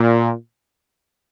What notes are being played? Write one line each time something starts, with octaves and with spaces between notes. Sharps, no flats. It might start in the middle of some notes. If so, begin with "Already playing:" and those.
Already playing: A#2